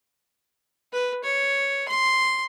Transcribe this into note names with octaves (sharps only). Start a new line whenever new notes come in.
B4
C#5
C6